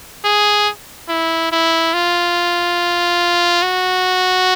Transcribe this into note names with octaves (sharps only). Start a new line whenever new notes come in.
G#4
E4
E4
F4
F#4